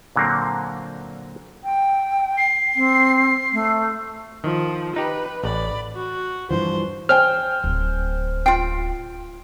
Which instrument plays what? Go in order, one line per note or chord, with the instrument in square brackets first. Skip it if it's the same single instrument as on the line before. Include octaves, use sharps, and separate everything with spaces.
[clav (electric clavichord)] A#2 D3 F#3 A#3 C4
[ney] G5
[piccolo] C7
[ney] C4
A3
[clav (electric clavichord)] D#3 [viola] F3
[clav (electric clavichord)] D#4 G4 [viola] B4
[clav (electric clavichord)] A1 [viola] D5 B5
[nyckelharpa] F#4
[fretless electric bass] G2 E3 F3 [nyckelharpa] C5
[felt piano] C5 G5 G#5 [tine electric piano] F6
[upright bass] D1
[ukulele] F4 G5 [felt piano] C7